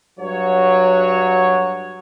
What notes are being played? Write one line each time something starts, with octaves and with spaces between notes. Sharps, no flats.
G2 F#3 F#4 C#5